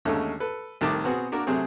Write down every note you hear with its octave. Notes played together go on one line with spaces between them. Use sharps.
D#2 D3 G#3 A3 C#4 D#4
A4 B4
C2 A2 D#3 A5 D6
B2 B3 C4 F#4 G#4
A#3 D4 F#4 A#4
C3 F#3 A3 C4 G#4